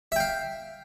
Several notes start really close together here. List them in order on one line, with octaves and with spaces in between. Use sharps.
E5 G5 F5